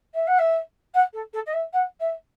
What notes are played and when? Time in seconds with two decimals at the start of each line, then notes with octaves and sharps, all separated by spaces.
0.14 E5
0.27 F#5
0.38 E5
0.94 F#5
1.13 A4
1.33 A4
1.46 D#5
1.53 E5
1.73 F#5
2.00 E5